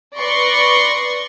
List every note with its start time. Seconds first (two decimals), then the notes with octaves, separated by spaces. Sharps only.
0.16 B4 D5 C6 C#6 A#6